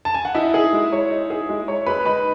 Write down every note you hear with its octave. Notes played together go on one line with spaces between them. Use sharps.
A5
G#5
F#5
D#4 E4 E5
G#4
G#3
C#5
D#4
G#4
G#3
C#5
G#3 B4 B5
D#4 B4 B5